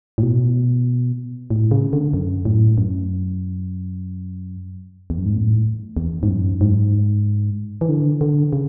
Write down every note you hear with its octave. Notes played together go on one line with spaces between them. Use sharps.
A2
B2
A2
C#3
D3
F#2
A2
F#2
E2
F#2
G#2
A2
E2
G#2
F#2
G#2
E3
D3
D3
C#3